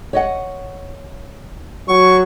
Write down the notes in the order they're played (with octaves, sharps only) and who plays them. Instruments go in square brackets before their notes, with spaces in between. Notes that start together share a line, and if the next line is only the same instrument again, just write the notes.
[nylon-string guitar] C#5 D#5 F#5
[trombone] F#3 [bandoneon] C#6